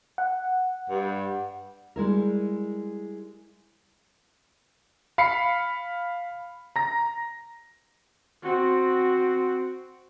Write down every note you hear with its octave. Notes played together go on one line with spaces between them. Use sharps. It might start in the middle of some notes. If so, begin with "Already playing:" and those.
F#5
G2
G3 G#3 E4 A#4
F5 B5 C7 C#7
A#5 A#6
C4 F#4